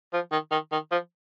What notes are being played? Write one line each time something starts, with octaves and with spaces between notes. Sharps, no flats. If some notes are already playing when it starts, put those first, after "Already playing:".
F3
D#3
D#3
D#3
F3